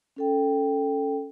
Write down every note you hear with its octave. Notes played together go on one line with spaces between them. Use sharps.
C#4 A4 G5